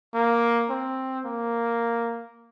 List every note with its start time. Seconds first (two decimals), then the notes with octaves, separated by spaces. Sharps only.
0.14 A#3
0.70 C4
1.25 A#3